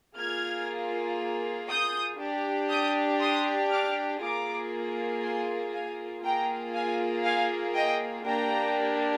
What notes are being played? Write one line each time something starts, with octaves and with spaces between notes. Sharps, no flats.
A#3 F4 G#4 F6 G#6
D#6 G6
D4 G4
D#6 G6
C6 D#6
D6 F6
A#3 F4 G#4 A#5 D6
G#5 C6
F5 G#5
A#3 F4 G#4 G5 A#5
F5 G#5
F5 G#5
D#5 G5
A#3 D4 G4 G5 A#5